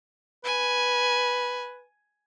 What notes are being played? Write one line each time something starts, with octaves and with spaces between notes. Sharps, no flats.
B4 G#5